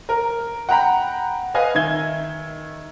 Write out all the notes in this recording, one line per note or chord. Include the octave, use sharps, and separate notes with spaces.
A#4
F#5 G5 A#5 B5
B4 D#5 F5 G#5
D#3 E5 G#6 G7